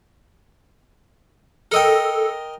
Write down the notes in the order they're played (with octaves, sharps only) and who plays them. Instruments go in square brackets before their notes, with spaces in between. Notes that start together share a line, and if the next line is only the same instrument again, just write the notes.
[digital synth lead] A4 [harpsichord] A#4 D#5 G5